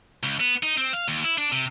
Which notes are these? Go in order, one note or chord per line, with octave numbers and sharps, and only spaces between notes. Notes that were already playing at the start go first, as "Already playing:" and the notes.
C#2
B3
D#4
C4
F5
D#2
E4
D4
C3